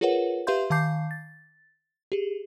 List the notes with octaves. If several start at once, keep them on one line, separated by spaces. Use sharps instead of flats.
F4 G#4 A#4 B4 C#5 F#5
G4 B4 E5 F5 C6 G6
D#3 F5 A5 D6 G6 C7
A6
G4 G#4